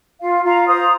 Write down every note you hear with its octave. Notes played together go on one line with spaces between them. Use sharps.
F4 F5
F4 F5 A#5
C5 A#5 D#6